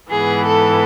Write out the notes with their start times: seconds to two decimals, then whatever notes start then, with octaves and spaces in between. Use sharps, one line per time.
0.11 G#2 E3 B3 G#4
0.46 A4